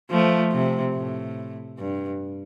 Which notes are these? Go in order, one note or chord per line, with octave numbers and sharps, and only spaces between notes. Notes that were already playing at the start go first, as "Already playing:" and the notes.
F3 A3
C3
A2
G2